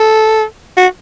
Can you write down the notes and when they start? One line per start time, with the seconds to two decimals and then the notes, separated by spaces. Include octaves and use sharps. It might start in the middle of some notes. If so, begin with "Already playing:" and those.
Already playing: A4
0.77 F#4